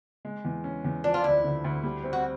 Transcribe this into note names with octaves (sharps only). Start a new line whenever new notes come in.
G#3
E2
C#4
E2
F3 D4
F4
D2 E4
D3
D2
G3
C4
F#4